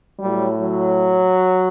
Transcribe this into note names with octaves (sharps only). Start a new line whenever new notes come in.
A2 F#3 G3
F#3